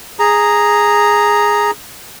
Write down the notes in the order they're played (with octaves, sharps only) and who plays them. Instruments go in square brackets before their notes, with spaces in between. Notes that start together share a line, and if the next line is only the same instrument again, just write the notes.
[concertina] G#4 A#5